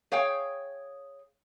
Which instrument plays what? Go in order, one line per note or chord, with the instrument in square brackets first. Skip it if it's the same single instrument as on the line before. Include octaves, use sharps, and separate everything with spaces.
[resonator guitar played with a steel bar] G#4 C#5 F5 G5